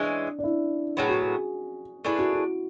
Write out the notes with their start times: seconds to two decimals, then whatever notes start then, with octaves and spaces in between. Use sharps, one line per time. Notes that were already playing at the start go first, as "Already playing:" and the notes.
Already playing: E3 G#3 C#4 D4
0.39 D4
0.44 E4
0.97 A2 F#3 B3 G#4
1.09 F#4
1.21 G#4
2.04 A3 D4 E4 G#4 B4
2.19 F#4
2.33 E4